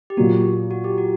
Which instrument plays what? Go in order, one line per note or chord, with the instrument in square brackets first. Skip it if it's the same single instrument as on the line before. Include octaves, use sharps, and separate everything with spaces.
[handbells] G4
[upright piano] A#2 F#3 A#3 [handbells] F#4
[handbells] F#4
G4
F#4